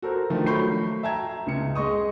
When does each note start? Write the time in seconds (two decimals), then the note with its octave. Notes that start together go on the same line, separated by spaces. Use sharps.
0.02 F#4 A4 A#4 C5
0.30 D3 D#3 F3 A3 D4
0.46 F#3 A3 B5 C#6 G6 C7
1.03 E5 G5 A5 A#5 G#6
1.47 C#2 C#3 C#7
1.75 G#3 D#5 C#6 D#6